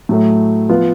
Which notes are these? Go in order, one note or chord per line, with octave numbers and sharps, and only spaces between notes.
A2 F#3 A3
F3 B3 F4